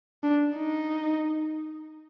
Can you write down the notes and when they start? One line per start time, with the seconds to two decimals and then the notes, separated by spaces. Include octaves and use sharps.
0.23 D4
0.57 D#4